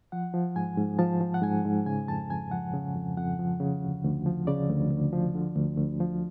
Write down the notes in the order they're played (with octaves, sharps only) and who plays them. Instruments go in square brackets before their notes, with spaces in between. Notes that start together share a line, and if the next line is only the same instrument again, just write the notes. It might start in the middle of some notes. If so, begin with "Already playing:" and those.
[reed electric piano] F3 F#5
F3
G#2 G#5
G#2
F3 A5
F3
F#5
G#2 G#5
G#2
C#3 G#5
F2 A5
F2 G#5
F3 F#5
C#3
F2
F2 F#5
F3
C#3
D2
D2
F3
C#3 D5
D2
D2
F3
D3
D2
D2
F3